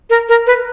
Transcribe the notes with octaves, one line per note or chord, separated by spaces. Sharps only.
A#4
A#4
B4